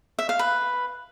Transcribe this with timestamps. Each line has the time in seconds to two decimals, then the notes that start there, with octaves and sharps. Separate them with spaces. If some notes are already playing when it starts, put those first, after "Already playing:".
0.19 E5
0.29 F5
0.39 B4